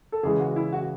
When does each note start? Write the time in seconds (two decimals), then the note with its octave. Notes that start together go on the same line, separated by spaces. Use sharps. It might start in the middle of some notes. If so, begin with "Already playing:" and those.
0.12 A4
0.23 C#3 E3 G#3 G#4
0.40 F#4
0.56 E4
0.73 F#4